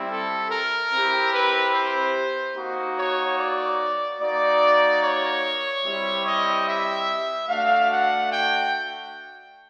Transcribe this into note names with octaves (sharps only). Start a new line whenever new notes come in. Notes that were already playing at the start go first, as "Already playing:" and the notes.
Already playing: G3 C4 E4
A4
A#4
C4 E4 G4
B4
C5
A#3 D#4 F#4
C#5
D5
A#3 D#4 F#4 D5
C#5
G3 C4 E4 G4
D#5
E5
A3 D4 F#4 F5
F#5
G5